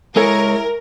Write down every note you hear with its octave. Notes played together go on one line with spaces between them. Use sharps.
G#3 E4 A4 A#4 C#5 G#5